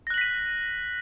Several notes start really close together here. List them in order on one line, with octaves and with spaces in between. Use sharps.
A#6 F#6 F#7 B6 D#7